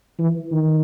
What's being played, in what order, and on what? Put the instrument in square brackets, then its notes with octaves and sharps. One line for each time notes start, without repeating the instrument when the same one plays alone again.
[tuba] E3
D#3